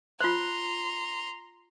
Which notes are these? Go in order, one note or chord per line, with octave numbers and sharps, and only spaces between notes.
F4 C5 A#5 C6